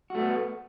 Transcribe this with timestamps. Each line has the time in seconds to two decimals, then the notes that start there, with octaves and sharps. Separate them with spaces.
0.10 F#4
0.15 A3
0.19 B3